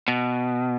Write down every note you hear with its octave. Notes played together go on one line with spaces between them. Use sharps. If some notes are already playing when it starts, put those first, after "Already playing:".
B2